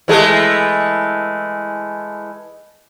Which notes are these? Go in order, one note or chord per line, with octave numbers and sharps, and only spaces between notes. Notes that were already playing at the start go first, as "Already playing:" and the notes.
E3 G#3 A3